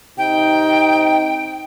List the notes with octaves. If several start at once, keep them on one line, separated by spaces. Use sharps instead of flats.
C3 D#4 G5